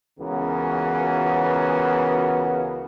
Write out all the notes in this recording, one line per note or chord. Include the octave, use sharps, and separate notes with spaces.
C#2 C#3 E3 B3 F#4 A#4